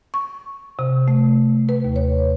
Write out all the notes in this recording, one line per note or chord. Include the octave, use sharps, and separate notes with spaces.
C#6
C3
A3
B4
D#2
C#5